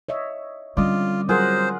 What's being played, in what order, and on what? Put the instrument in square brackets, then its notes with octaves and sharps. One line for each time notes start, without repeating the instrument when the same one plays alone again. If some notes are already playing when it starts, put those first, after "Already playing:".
[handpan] C#5 D#5 E5
[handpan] D3 C#4 [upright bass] G3 C4 [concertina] F4 [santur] D5 D#5
[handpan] F#3 A#4 [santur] F4 G#4 F#5 [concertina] C5